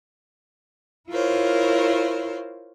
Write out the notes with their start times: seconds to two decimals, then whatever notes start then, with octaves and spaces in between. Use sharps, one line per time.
1.09 E4 F4 A#4 C5 C#5